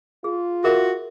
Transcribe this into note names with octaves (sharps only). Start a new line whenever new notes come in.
F4 G#4
F#4 G#4 A#4 E5